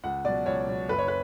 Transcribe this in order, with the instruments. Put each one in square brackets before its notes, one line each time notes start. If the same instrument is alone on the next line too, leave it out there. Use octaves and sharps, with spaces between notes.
[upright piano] C#2 F#5
B2 F#3 D5
C#2 C#5
B2 F#3
F#1 B4
C#5
B4